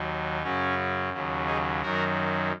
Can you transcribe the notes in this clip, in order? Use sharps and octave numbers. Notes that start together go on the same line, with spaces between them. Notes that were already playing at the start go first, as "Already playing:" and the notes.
Already playing: D#2 D#3 F#3
F#2 C#3 F#3 C#4
D#2 C#3 F#3
D#4 G#4
F#2 D#3 F#3 F#4 A#4